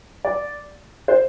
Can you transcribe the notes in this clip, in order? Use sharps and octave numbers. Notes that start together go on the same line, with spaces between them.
D5
C5